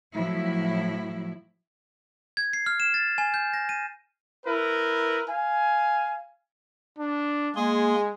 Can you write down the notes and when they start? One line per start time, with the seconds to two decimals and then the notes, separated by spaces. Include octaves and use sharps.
0.14 A2 F3 F#3 E4
2.37 G#6
2.53 C7
2.66 F6
2.80 E7
2.94 A6
3.18 G#5
3.34 G6
3.53 A#6
3.69 D#7
4.46 E4 A#4 B4
5.29 F5 G#5
6.99 D4
7.56 G#3 A#3 G#4 C6